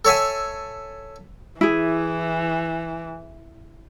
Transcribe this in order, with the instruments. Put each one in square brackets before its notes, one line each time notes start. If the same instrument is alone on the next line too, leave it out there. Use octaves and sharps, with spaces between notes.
[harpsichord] A4 C#5 E5 G#5
[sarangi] E3 [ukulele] E4 G#4